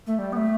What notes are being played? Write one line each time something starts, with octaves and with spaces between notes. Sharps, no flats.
A3
G3
B3
A3